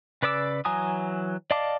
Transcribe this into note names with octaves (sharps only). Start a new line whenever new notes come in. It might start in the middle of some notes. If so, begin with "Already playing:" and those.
C#3 B4 D5 D6 E6
E3 F#3 G#5 A#5 D#6
D5 D#5 F5 A5 D6